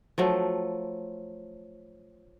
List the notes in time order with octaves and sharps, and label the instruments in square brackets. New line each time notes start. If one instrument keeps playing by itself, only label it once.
[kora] F3 F#3 A3